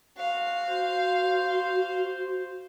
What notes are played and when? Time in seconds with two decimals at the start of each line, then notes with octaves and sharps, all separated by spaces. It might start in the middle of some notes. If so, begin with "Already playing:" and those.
0.17 G#3 F#4 F5
0.68 F#4 C5